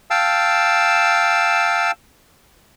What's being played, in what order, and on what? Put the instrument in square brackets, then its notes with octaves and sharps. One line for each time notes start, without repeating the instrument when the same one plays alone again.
[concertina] F5 G5 A5 E6